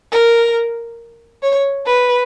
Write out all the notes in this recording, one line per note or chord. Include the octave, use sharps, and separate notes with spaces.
A#4
C#5
B4